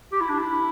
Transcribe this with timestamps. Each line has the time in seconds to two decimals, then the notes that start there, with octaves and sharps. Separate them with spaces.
0.12 G4
0.21 E4
0.29 D4
0.39 E4